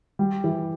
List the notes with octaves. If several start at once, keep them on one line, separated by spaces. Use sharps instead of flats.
G3
E3